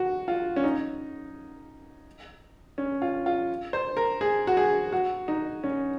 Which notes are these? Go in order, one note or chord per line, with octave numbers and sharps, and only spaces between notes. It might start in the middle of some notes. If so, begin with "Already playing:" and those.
Already playing: F#4
F4
C#4
D#4
C#4
F4
F4
C5
A#4
G#4
F#4
G#4
F#4
D#4
C#4